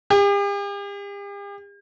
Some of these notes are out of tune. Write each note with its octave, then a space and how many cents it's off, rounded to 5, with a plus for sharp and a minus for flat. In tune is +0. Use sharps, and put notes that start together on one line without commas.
G4 +45